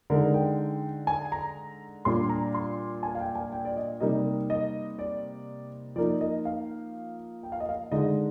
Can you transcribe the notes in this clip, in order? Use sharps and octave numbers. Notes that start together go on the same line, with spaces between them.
D3 G#3 D#4 A#4
G5
G#5
A#5
A#2 G3 D4 C6
A#5
C6
G#5
F5
G5
G#5
G5
D5
D#5
C3 G3 A#3 D#4 D#5
D#5
D5
F3 A#3 D#4 D5
D#5
F5
G5
F5
D#5
F5
D3 G#3 D#4 D#5